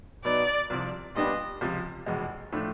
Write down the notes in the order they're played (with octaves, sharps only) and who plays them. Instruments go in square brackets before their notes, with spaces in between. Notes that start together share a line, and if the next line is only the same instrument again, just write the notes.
[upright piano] B2 F#3 B3 D#4 [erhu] D5
[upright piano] C2 C3 F3
[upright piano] A#2 G3 B3 D4 G4 [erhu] D#5
[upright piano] C#2 C3 F3
F1 E2 B2 G#3
A2 F3 A3 D4